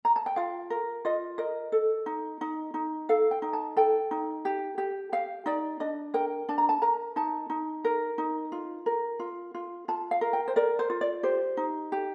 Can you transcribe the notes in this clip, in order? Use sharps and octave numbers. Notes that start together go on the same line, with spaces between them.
A#5
A5
G5
F4 F5
A#4
F4 D#5
A#4 D#5
A4
D#4
D#4
D#4
A4 F5
G5
D#4
A5
A4 G5
D#4
G4
G4
G4 F5
D#4 D5
D4 D#5
A#4 G5
D4 A5
A#5
A5
A#4 A#5
D#4 A5
D#4
A#4
D#4
F4
A#4
F4
F4
F4 A5
F5
A#4
G5
C5
A#4 D5
C5
F4
D5
G4 C5
D#4
G4